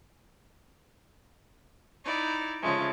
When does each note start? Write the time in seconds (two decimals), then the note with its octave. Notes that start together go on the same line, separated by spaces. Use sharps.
2.04 D#4 E4 D5
2.61 C#3 F3 G#3 A3